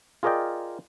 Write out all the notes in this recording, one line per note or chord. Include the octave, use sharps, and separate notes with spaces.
F4 G#4 A#4 D5 D#5 G5